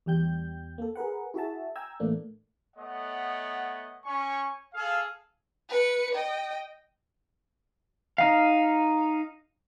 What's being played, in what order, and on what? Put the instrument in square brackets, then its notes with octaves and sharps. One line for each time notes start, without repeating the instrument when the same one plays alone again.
[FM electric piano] E2 G3 G5 G6
A#3 A4
G#4 A#4 B4 F#5
E4 F#4 G#4 E5 A5
G5 G#5 A#5 E6 G#6
A2 E3 A3 A#3 D4
[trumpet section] A3 B3 C#5 D#5 F#5
C#4 G#5 C#6
G#4 A4 F5
[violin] B4 C#7
D#5 G5
[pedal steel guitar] D#4 F5